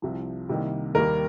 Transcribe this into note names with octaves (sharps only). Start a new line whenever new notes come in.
C2 C3 F3
C2 C3 D#3 G3 A#3
D#2 D#3 G3 A#3 A#4